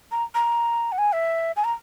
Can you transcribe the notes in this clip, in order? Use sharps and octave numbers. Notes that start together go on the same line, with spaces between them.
A#5
A#5
F#5
G#5
E5
G#5
A#5